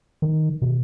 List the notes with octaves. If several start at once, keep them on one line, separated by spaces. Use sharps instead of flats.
D#3
B2